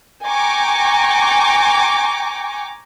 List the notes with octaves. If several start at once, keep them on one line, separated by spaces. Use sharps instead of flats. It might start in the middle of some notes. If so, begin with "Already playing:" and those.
G5 G#5 A#5 C#6 D6